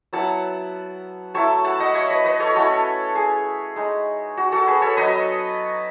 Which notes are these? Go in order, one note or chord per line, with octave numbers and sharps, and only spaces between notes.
F#3 B3 E4 F#5 A5
F#3 A3 E4 A5 C#6
F#5 A5
D#5 F#5
C#5 E5
B4 D#5
B4 D#5
A4 C#5
A3 C#4 E4 F#4 A4
G#4
G#3 D#4
F#4
F#4 A4
G#4 B4
A4 C#5
F#3 B3 D#4 B4 D#5